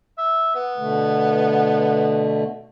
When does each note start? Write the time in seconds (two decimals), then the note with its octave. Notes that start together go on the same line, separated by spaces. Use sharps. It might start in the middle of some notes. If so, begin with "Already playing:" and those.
0.18 E5
0.55 B3
0.78 B2 D3 A3